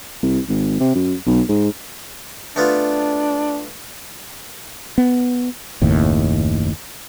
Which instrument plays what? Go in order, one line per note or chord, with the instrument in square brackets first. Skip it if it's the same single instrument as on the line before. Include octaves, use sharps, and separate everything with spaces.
[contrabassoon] C2
G#1
C3
F#2
B1
G#2
[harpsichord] A3 B3 F4 [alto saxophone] D4
[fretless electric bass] B3
F#1 D#2 A2